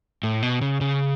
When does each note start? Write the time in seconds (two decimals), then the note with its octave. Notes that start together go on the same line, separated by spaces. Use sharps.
0.23 A2
0.43 B2
0.61 C#3
0.81 C#3